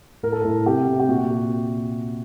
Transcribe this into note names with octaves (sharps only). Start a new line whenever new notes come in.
A2 A#4
A4
A2 A#4
C3 G4
C3
G4
A#2 F#4